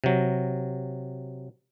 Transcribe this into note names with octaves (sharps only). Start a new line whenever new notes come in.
C3 F#3